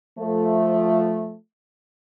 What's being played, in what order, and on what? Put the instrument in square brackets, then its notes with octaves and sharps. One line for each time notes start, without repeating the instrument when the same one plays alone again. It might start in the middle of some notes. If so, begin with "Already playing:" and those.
[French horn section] F3 A3